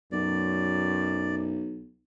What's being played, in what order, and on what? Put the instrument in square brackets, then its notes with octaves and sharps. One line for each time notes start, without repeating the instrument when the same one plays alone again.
[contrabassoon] B1 [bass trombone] F#2 [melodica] D5